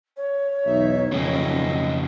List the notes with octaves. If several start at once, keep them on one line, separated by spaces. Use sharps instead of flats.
C#5
B1 E2 D#4 E5
D#1 F2 C#3 F#3 D#5